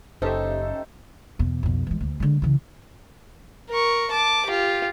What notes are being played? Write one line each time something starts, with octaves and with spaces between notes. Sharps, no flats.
F#1 C#4 D#4 G4 A4 C5 E5
E2 B2
B1 F2
E3 G#3
D2
D3 G#3
C#3 E3
A#4 C#6
A5 D6
F4 G4